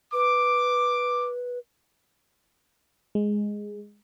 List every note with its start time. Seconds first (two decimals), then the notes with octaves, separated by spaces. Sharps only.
0.13 B4 D6
3.15 G#3